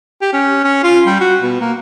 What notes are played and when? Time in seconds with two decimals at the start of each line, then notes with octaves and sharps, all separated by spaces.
0.22 G4
0.33 C#4
0.64 C#4
0.83 F4
1.06 G3
1.21 F#4
1.41 B2
1.61 A#3